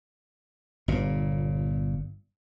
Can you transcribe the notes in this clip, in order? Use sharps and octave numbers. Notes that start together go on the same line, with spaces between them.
G1 A#2